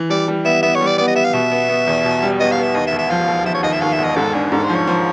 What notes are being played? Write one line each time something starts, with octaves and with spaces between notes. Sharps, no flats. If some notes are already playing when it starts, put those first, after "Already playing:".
Already playing: E3
G3 D5
G3
B3 E5
B3 E5
C#5
G3
D5
B3 D5
D#5
B3 E5
F5
B2 E5
B3
B3
E2
B2
G3
B3 D#5
F5
B3
E5
D#2 D#5
E5
E1
E5
F3 F5
E1
F3 E5
C#5
D#2 D#5
E5
D#2 F5
E5
E1
D#5
G#2 A4
D4 G#4
G#2 A4
C5
F3
C#5
F3